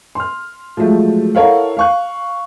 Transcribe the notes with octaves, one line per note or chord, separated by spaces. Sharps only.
C6 F6
F3 F#3 G#3 A3
E4 A4 A#4 C#5 F5 F#5
F5 C#6 F#6